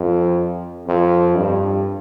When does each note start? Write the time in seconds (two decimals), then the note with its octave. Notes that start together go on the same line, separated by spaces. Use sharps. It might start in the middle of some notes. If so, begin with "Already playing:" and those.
Already playing: F2
0.87 F2
1.37 G2